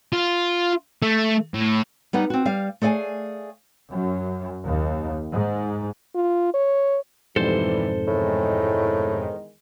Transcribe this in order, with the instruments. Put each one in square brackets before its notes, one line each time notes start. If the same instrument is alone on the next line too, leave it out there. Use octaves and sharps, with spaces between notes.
[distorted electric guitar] F4
A3
A2
[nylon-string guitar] G3 B3 D#4 F#5
C4 F#4
G3 F5
A3 G#4 D5 F5 G#5
[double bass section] F#2
D#2
G#2
[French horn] F4
C#5
[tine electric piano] F2 G#2 B2 [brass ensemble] E3 G3 [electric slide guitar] A4 C5
[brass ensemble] E2 D#3 G#3 [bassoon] A2